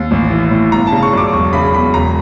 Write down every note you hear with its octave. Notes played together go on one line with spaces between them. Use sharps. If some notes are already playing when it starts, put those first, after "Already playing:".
Already playing: D#2
A1
E3
A2
G1 A#5
A5
C#3
C#6
F#2 D6
E1 C#6
C#3 B5
E2 B5
E1 A#5